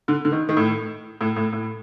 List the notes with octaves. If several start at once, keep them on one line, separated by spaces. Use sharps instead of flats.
D3
D3
D#3
D#3
A2
A2
A2
A2